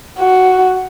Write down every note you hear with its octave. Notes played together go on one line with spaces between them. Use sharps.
F#4